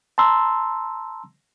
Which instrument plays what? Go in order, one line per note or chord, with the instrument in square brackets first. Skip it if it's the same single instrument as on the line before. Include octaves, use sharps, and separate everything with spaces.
[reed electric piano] A5 A#5 C6 E6